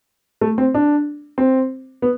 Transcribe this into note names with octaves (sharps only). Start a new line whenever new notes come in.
A3
C4
D4
C4
B3